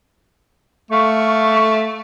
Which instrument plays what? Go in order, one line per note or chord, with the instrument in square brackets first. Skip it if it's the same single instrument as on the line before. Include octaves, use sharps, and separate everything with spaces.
[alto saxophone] A3 [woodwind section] F5 C#6